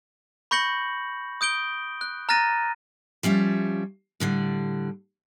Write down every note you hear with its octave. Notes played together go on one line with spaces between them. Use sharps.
B5 C#6 G6 A#6 C#7 F#7
D#6 G6 D7 G7
F#6
A#5 F6 F#6 A6 A#6 D#7
F3 G3 C#4 E5
A2 D3 G3